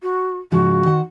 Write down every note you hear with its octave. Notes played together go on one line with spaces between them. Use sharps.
F#4
G#2 C#3 F3 F#4
D#3 C5 F#5